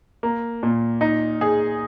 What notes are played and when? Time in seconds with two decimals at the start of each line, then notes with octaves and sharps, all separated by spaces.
0.23 A#3
0.63 A#2
1.01 D#4
1.41 G#4